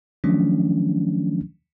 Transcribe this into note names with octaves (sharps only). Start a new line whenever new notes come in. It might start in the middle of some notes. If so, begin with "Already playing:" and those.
D#3 F3 F#3 A3 C#4 D4